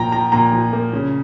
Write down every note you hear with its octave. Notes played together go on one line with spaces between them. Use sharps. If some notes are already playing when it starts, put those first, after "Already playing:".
Already playing: A#2 F3 G5 A#5
F3 A#5
A#2 A#5
F3
A#3
C#3